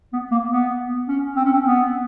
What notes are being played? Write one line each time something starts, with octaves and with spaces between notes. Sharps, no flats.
B3
A#3
B3
C#4
C4
C#4
C4
B3